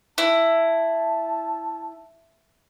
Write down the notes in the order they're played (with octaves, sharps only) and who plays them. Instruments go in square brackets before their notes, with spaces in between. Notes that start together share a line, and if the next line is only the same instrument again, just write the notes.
[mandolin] E4 [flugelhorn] A5